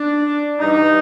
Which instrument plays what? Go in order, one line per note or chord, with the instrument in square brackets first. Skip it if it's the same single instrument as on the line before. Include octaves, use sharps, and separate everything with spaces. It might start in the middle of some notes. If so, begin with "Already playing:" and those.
Already playing: [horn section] D4
G2 E3 D#4